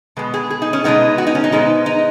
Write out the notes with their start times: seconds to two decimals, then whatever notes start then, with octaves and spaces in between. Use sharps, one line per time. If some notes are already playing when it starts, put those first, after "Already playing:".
0.17 B2 G#3 B3
0.34 G#4
0.50 G#4
0.62 D#4
0.73 C#4
0.84 B2 G#3 B3 D#4
1.18 F#4
1.27 D#4
1.35 C#4
1.44 D#4
1.52 G#2 G#3 B3
1.86 D#4